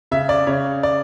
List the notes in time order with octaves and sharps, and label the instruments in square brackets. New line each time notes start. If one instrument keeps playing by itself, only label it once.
[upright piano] C#3 E5
D5
C#3 C#5
D5